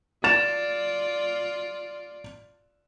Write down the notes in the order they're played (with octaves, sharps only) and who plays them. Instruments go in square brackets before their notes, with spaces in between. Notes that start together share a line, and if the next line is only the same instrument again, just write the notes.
[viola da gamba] F4 D5 [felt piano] A6 E7